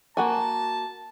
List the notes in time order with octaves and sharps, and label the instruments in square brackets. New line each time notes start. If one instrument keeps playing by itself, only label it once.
[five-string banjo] A#3 F#4 G#5 [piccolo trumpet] A5